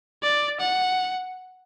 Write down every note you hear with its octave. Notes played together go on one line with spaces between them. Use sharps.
D5
F#5